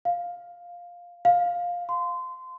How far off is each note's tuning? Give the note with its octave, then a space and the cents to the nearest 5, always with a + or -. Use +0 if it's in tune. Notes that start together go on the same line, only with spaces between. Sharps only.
F5 +5
F5 +10
C6 -25